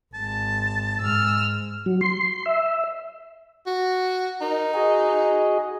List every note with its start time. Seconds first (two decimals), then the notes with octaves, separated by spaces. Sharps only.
0.14 G#1 G#3 A5
1.01 G#2 G#3 E6 F6
1.86 F#3
2.01 C6
2.46 E5
3.66 F#4
4.41 D#4 A#4
4.74 F#4 G#4 D#5